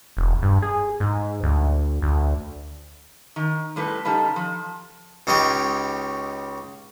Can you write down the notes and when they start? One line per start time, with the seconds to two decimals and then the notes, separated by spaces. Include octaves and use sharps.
0.17 E1
0.42 G2
0.62 G#4
1.00 G#2
1.43 D2
2.02 D2
3.36 D#3
3.76 A2 G3 A4 B4
4.05 C#3 G3 D#4 A4
4.36 F3
5.27 C#2 C#3 D#4 G4 C#5